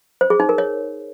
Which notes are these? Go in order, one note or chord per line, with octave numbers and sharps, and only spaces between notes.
C5
G#4
D#4
A#4
C#5